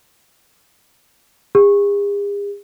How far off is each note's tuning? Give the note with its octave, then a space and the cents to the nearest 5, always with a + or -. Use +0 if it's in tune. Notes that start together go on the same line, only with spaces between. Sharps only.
G#4 -45